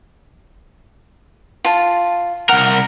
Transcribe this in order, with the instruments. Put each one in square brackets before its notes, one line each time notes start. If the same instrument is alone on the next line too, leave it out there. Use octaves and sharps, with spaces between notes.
[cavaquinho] F4 A5
[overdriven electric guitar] C2 A#4 [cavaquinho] F#5